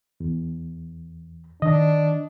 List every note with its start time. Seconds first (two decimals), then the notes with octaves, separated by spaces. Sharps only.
0.20 E2
1.62 D#3 D4 D#5